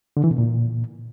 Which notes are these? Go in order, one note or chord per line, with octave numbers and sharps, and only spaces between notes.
D3
E3
B2
A#2